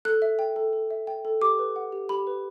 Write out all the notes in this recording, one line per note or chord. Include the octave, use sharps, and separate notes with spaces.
A4 F#6
E5
G5
A4
A4
E5
G5
A4
G4 D6
B4
F#5
G4
G4 B5
B4